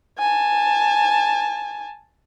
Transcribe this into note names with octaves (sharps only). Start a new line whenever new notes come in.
G#5 A5